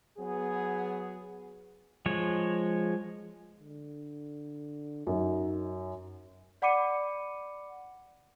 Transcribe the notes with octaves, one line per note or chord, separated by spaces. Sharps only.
F#3 B3 G#4
F3 G#3 C#5
D3
F#2 D#4
D5 F#5 B5 D6 C#7 D#7